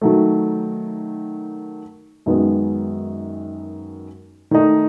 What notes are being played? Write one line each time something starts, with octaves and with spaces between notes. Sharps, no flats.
D#3 F#3 A3
F#2 D#3 G#3 B3
D#3 A3 D#4